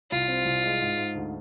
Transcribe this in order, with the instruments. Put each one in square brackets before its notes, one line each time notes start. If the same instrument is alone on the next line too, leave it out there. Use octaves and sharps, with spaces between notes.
[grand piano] C2 [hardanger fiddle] F4
[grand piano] C4
C2
G#3
G#2
G#2
D2